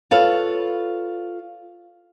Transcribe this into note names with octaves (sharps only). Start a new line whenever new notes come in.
F4 A4 B4 C#5 F5